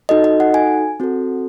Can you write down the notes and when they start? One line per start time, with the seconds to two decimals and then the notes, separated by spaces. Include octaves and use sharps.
0.09 D#4 F#4 A4 D#5
0.24 D#5
0.40 F#5
0.54 G#5
1.00 C4 F#4 A4